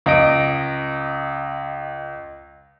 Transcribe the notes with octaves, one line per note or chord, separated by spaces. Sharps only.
C#2 D#5 D7